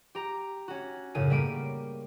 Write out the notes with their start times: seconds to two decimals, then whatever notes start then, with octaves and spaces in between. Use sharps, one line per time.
0.15 G4 A#5
0.68 C#4 F#4
1.15 F#2 A2 C#3 D#7
1.30 G3 A#3 D7 D#7